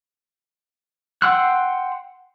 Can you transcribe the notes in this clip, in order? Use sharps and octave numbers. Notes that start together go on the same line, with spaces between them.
F#5 G5 C6 E6 F#6